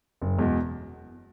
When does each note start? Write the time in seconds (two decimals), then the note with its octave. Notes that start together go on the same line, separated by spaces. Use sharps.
0.22 F#1
0.38 E2 B2 G#3